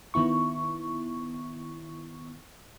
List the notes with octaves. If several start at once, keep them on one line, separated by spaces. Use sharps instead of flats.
D#3 B3 E4 C#6